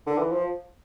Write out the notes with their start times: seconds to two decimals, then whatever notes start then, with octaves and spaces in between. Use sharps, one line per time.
0.06 D3
0.18 E3
0.31 F3